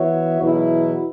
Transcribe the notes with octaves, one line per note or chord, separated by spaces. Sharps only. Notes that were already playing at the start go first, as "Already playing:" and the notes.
Already playing: E3 B3 F#4 C#5 E5
E2 B2 F#3 E4